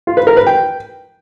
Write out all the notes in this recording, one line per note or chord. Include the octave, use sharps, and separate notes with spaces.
F4
B4
A#4
B4
G5